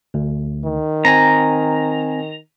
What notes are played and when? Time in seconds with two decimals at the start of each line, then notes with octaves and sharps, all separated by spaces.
0.14 D2
0.66 D#3
1.05 C4 G#5 A#5